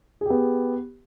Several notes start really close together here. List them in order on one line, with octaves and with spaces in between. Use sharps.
G#4 G4 B3